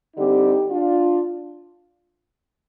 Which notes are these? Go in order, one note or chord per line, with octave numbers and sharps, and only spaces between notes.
D3 G3 C4 D#4 G4
D4 F4